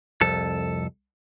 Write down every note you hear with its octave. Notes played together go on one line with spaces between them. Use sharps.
C2 F2 A4